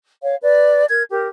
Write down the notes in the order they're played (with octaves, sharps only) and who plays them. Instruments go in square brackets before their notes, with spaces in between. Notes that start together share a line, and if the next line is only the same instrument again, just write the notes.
[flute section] C#5 F5
B4 D5
A#4 G#6
G4 A#4